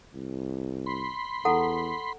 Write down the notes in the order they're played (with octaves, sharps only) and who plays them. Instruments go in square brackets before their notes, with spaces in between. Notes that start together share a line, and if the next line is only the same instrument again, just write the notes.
[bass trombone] C2
[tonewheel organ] B5 C6
[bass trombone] E2 [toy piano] A4 F#5 A#5